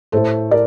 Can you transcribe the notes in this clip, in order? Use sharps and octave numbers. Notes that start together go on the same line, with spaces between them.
A2 A3 A4 C5
A#4 D5